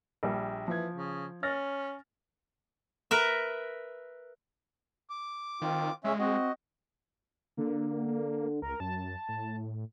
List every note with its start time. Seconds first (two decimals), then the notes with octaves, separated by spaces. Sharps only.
0.23 A#1 G3
0.68 E3 F3 G#6
0.94 C#3
1.43 C#4 F6 A6 A#6
3.11 A#4 B4 E5
5.10 D6
5.62 D#3 C4 F4
6.04 F2 C#3 G#3 C#4 E5
6.19 C4 F#4 D#5
7.57 D3 A#3
8.08 A#3
8.62 C#2 A#4
8.80 F#2 A5
9.28 A2